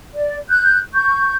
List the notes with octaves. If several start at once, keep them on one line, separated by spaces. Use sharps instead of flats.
D5
F#6 G6
C#6 G6